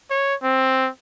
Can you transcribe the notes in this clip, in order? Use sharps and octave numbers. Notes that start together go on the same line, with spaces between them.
C#5
C4